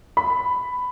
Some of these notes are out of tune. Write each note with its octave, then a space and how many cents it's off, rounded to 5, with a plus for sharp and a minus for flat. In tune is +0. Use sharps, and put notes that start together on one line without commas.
B5 +10